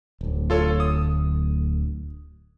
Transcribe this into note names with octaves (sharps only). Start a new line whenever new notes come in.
D1 D2
F4 A4 C#5
D#6